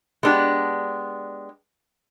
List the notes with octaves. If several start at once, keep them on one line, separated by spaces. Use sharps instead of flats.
G#3 B3 D4 G4